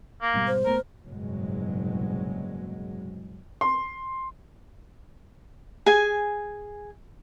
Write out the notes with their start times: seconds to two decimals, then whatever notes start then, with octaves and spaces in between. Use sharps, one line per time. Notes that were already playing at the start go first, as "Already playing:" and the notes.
0.22 A#3
0.34 G#2 B2 G3
0.47 C5
0.65 A#1 A3 B3 A#4
1.07 F#1 C2 G#2 B2 F#3 G#3
3.61 C6
5.86 G#4 G#5